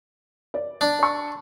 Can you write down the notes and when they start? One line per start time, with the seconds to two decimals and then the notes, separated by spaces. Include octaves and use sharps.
0.54 D5
0.81 D4
0.99 D5 C#6